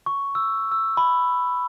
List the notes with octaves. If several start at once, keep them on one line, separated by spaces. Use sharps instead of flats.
C#6
E6
E6
B5